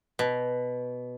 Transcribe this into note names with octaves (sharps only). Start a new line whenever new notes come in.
B2